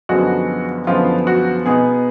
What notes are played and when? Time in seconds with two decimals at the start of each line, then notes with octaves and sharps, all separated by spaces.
0.09 F#2 D3 F3 G#3 B3 F#4
0.87 F#2 D3 F3 G#3 B3 F4
1.27 F#4
1.66 B2 G#3 B3 D#4 G#4